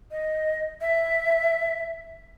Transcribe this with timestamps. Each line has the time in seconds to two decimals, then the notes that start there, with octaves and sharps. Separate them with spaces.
0.11 D#5
0.81 E5